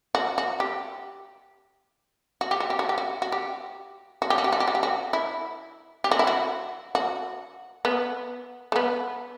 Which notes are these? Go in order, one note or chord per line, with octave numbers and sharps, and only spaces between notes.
F#4
F#4
G4
F#4
G4
F#4
G4
F#4
G4
F#4
F#4
G4
F#4
G4
F#4
G4
F#4
G4
F#4
G4
F#4
E4
G4
F#4
E4
F#4
F#4
B3
A3
B3